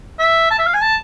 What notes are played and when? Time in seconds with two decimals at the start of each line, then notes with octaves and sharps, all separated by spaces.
0.19 E5
0.50 A5
0.59 E5
0.67 F5
0.74 G#5
0.81 A5